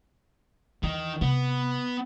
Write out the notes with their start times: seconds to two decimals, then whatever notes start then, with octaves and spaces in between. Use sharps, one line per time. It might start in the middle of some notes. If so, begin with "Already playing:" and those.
0.83 E2 D#3 E3
1.21 C3 B3